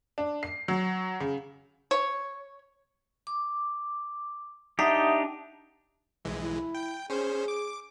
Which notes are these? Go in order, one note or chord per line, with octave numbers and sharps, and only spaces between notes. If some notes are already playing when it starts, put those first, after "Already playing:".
D4
C7
F#3
C#3
C#5
D6
D4 D#4 G4 E5 F#5 D#6
B1 E3 G#3
E4
G5
C#4 G#4 C5
D6